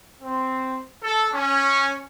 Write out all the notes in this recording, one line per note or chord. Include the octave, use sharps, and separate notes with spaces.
C4
A4
C#4